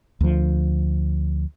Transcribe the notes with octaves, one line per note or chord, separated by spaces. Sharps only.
D2 F3